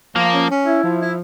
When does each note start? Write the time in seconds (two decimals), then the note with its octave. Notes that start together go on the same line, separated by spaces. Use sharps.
0.16 F3 A#3
0.32 C#4
0.50 C#4
0.66 E4
0.83 F3
1.00 E4